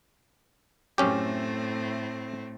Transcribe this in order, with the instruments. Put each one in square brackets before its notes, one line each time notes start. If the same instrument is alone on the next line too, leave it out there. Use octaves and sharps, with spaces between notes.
[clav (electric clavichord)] F#2 C#4 G4 [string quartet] A2 A3 C4